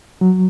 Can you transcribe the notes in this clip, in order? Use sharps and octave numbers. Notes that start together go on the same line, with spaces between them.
F#3